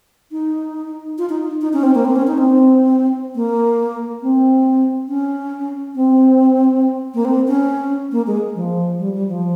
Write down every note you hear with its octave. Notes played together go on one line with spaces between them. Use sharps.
D#4
F4
D#4
D#4
C#4
C4
A#3
C4
C#4
D#4
C4
A#3
C4
C#4
C4
A#3
C4
C#4
A#3
G#3
F3
G3
G3
F3